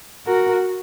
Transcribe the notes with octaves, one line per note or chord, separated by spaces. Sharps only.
F#4 A#4